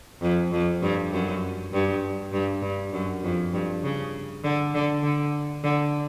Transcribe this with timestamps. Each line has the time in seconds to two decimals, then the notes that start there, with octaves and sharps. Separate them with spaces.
0.22 F2
0.52 F2
0.82 G2
1.12 F#2
1.73 G2
2.33 G2
2.62 G2
2.93 F#2
3.23 F2
3.53 G2
3.83 C#3
4.44 D3
4.74 D3
5.03 D3
5.64 D3